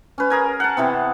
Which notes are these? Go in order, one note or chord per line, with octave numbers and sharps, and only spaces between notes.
C#4 B4
G#4 A#4 G#5
F#5 A5
C3 E3 B3 C4